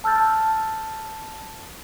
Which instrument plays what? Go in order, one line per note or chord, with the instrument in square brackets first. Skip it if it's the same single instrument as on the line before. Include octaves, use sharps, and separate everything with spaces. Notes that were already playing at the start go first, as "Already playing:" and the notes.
[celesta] A5 E6 F6 G6 A6